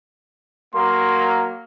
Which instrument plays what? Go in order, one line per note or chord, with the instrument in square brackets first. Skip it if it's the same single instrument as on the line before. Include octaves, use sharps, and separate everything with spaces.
[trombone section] F#3 A#3 [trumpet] C6